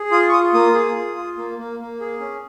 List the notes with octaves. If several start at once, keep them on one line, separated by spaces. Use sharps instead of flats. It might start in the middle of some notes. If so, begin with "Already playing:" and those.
Already playing: G#4
F4 D#6
C#6
F4 D#6
A#3 D#6
G#4
F4
F4
A#3
A#3
A#3
G#4
C#4